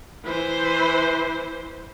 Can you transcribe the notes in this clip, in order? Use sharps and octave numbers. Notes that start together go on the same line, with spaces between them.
E3 C5